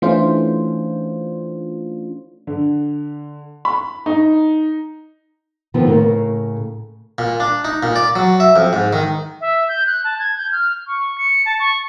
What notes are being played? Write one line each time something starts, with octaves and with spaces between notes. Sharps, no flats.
E3 A3 C#4 D4 F4 C5
D3
B5
D#4
C3 D#3 F3 B3 C4
A2 C#3 A#4
A#2
D4
D#4
A#2
D5
F#3
E5
F2
G#2
D#3
E5
G6
F#6
A5
G#6
G6
F6
C#6
C#7
A5
C#6